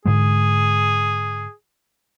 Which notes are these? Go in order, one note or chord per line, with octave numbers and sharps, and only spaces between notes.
G#2 D3 G#3 G#4